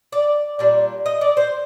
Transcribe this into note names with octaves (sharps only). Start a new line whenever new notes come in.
D5
A#2 G3 D4
D#5
D5
C5